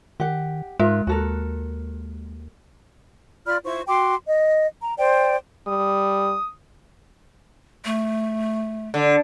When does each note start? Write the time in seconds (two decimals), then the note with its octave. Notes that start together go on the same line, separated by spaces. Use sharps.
0.20 D#3 G4 F#5
0.80 G#2 G#3 F4 A#4 E5
1.07 D#2 F#4 A4 A#4
3.46 F4 D5 B5 F6
3.65 E4 F4 C5 C#6
3.87 F#4 G5 C6 D6
4.26 D#5
4.82 A#5
4.98 C5 D5 G5
5.67 G3 D#6
7.85 A3
8.94 D3